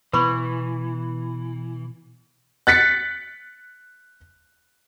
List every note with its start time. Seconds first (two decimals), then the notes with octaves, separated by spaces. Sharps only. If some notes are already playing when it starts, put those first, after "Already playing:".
0.13 B2 E3 B3 B4 B5 C#6
2.67 F#6 A6 B6 C#7